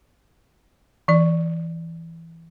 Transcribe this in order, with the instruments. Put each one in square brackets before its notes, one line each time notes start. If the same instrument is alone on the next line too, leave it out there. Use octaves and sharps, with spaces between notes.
[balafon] E3 D5